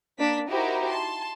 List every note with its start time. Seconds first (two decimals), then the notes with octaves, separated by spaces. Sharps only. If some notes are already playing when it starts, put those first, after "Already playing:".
0.19 A#3 D4 B6
0.49 D#4 E4 F#4 G4 A#4 C5
0.87 A5 C6